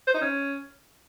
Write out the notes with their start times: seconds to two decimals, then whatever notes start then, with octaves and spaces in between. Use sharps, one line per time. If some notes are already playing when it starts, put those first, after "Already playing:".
0.07 C5
0.14 D#4
0.21 C#4